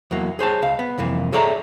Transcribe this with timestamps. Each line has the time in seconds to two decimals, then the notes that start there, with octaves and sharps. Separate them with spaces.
0.11 E2 F#3 A#3
0.39 G#4 C5 C#5 A5
0.62 C#2 F5
0.79 B3
0.98 C2 F2 E3 A#3
1.32 G#4 A4 C#5 D5 E5 A#5